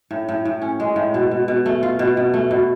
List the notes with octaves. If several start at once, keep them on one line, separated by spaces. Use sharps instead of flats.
A2
A2
A2
C#4
G#3
A2
B2
B2
B2
A3
F4
B2
B2
A3
B2